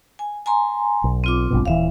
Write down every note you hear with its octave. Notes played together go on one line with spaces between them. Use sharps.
G#5
G#5 A#5 C6
B1
C4 F4 D6
A#1 G2 B2
D#1 E3 E5 F5